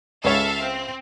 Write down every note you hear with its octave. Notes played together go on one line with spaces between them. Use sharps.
C#2 A4 C#5 E5 F5
C4